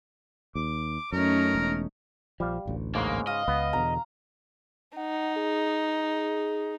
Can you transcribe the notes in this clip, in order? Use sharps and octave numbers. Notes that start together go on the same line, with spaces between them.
D#2 D6
F#2 A3 C#4 D#4 A#4
E1
A#1 F3 G3 F5
D1 A1 D2
G#2 C#3 G#3 A#3
D#5 F5
C#2 B3
E2 B2 D3 A#5
D#4 F#5
G#4